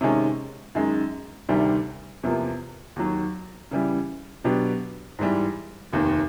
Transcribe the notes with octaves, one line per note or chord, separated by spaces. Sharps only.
C3 D#3 G#3 C#4
F#2 D#3 G#3
D2 C3 D#3 G3
E2 C3 F3 A#3
D#2 D#3 F#3
C#3 E3 G3
B2 F#3 B3 D4 G4
G#2 E3 G3
F1 D#2 D#3